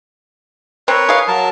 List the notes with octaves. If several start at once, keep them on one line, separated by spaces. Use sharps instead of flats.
C4 A#4 B4 C#5
G#4 F5
F#3 A#4 A5